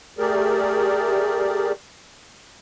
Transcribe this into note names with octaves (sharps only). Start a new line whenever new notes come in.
A3 G4 G#4 A#4 D5